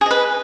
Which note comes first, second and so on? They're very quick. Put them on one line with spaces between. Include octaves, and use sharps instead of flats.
G#4 D#5 B4